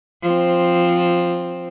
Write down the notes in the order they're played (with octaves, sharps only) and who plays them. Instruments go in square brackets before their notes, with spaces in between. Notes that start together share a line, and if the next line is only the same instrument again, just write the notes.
[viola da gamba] F3 C4